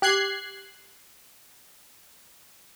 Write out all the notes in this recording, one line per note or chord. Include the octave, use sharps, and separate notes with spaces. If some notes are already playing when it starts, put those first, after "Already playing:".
G4 F#6 G#6 C7